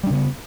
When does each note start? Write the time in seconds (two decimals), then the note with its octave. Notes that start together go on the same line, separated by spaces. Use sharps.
0.04 G3
0.07 D4
0.10 C#3
0.14 B3